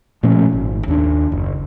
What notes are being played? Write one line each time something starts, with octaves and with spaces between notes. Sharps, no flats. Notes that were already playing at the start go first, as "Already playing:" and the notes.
A#2 F3 A3 C#4
G#1
D#2 D4
F#1